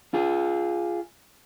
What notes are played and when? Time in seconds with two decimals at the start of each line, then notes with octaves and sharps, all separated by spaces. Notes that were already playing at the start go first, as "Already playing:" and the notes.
0.14 F4 G#4